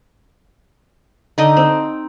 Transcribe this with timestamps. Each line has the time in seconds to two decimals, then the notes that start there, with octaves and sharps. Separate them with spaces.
1.38 D3 D#4 D#5
1.57 C4